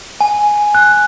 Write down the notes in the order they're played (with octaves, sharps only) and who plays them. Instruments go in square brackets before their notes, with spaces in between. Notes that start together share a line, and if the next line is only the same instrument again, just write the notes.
[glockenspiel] G#5
F#6